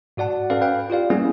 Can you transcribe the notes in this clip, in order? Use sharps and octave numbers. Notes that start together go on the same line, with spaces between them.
G#2 F#4 D5 F#5 A5
C#4 A4 B4 D5 F5
B4 F5 G5
F4 G4 D5 F5
G3 A#3 B3 C#4 E4 G#4